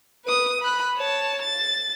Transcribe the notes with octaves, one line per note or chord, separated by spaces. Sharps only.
B4 D#6
B5 F#6
C#5 A5
A6